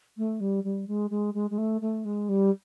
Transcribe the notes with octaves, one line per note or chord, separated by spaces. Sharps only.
A3
G3
G3
G#3
G#3
G#3
G#3
A3
A3
G#3
G3